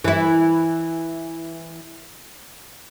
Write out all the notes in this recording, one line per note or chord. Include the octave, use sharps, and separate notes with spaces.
E3 E4